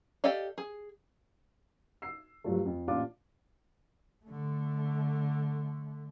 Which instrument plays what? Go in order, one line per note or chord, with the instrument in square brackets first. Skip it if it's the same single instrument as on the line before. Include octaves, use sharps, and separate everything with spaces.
[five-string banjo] G4 A4 D5 D#5 F5
G#4
[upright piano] E6 C7
G2 F3 F#3 A3
F2
A1 A#2 D4 F4 D6
[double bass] D3 A3